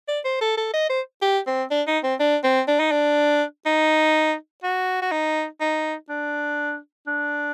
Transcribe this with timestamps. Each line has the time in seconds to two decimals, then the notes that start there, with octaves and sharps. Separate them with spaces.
0.08 D5
0.25 C5
0.41 A4
0.57 A4
0.73 D#5
0.89 C5
1.22 G4
1.47 C4
1.71 D4
1.87 D#4
2.03 C4
2.20 D4
2.44 C4
2.68 D4
2.80 D#4
2.91 D4
3.66 D#4
4.63 F#4
5.02 F#4
5.11 D#4
5.60 D#4
6.09 D4
7.07 D4